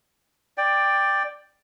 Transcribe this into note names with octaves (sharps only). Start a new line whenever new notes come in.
D5 G5